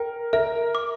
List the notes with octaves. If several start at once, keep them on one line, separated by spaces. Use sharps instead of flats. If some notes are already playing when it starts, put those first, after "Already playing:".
Already playing: A#4 G5
A#4 E5
D6